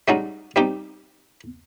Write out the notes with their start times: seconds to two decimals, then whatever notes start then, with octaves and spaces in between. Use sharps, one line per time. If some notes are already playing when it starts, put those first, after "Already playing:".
0.08 G3 G#3 C#4 D#4 F#4
0.56 G3 C4 D#4 G4